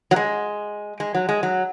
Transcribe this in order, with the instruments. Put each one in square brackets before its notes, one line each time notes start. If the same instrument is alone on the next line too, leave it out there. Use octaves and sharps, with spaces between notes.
[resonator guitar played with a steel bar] F#3
G#3
G#3
F#3
G#3
F#3